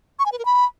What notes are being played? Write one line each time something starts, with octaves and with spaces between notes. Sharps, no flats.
C#6
G#5
B4
A#4
B5